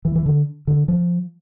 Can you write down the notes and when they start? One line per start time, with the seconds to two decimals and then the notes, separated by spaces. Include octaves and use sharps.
0.05 E3
0.15 E3
0.26 D3
0.67 D3
0.88 F3